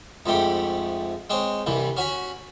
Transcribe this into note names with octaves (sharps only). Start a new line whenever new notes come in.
F2 G#2 A3 G4 B5
G#3 C4 C#5
C2 G2 E3
C#4 F#4 G#5 B5